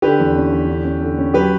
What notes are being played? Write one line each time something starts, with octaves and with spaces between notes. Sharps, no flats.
D3 G4 B4
E2
C#4
E2
D3
C#4
D3
C#4
F#3 G4 B4